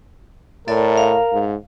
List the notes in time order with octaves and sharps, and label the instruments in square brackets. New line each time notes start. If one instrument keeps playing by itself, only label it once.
[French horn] A2 [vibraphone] A4 D5 E5 [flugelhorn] A#4
[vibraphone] F5
[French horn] G#2